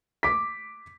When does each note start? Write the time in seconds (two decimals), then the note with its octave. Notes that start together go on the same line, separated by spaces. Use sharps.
0.23 D6 B6